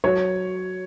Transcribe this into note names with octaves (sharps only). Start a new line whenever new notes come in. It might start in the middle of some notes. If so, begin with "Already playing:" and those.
F#3 C#5